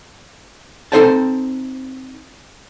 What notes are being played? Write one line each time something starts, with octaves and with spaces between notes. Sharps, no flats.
C4 D#4 A4 C5 G5 A5